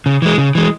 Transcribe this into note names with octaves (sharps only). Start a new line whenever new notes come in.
C#3
E3 G#3
C#3
E3 G#3